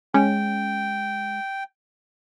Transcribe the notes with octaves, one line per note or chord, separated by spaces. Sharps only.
G#3 C#4 G5